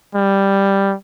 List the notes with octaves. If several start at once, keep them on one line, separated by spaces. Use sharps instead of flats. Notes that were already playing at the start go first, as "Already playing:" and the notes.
G3